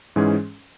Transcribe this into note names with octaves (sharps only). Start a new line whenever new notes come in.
G#2 E3 G#3 C#4 G#4